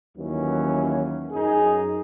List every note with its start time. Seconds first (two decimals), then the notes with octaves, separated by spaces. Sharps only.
0.17 D#2 E3 F#3 C#4
1.32 F#2 D#4 G#4